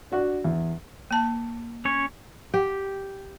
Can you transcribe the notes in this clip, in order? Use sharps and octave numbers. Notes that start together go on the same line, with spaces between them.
D4 F#4 F#5
E2
A#3 A5
C#4 C#5
G4